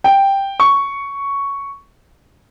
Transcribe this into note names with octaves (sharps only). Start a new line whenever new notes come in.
G5
C#6